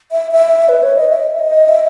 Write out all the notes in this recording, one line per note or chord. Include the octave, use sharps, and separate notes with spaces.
E5
E5
B4
C#5
D#5
E5
D#5
E5